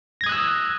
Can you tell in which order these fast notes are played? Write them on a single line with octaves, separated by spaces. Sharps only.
A#6 G#6 D#6 F#6 E6